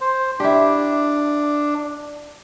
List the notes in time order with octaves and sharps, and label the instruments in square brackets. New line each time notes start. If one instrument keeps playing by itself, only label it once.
[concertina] C5
[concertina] D4 [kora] E4 G4